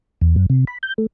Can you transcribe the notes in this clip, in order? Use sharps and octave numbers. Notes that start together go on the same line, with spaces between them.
E2
F#2
C3
B5
G6
A3